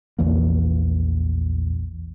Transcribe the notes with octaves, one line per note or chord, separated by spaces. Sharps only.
A#1 E2 E3 A#3